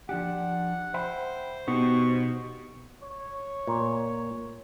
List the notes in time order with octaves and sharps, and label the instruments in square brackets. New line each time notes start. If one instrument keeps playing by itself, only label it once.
[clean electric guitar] F3 D4 G4 [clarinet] F#5
[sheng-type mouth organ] C5 [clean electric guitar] E5 G5 B5
[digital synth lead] B2 [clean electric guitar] D#4 G4 [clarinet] C#6
[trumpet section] C#5
[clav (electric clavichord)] A#2